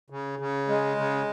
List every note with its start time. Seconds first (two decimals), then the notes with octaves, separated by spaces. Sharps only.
0.10 C#3
0.39 C#3
0.68 G#3
0.97 C#3